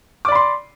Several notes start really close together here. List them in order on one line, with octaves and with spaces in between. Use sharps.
D6 D5 B5 C6